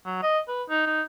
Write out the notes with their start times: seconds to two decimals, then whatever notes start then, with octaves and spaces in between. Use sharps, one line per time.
0.06 F#3
0.23 D#5
0.48 B4
0.69 D#4
0.86 D#4